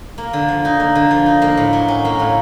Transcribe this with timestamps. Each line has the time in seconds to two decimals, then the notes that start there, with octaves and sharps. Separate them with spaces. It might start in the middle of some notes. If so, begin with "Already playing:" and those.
0.18 A#3
0.33 D3
0.48 F3
0.65 D#4
0.80 A#3
0.95 D3
1.11 F3
1.26 D#4
1.42 A#3
1.57 A2
1.73 F#3
1.88 C#4
2.05 A#3
2.19 A2